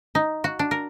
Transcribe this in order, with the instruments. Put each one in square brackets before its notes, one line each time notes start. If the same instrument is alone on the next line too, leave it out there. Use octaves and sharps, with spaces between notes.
[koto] D#4
F#4
D4
A#4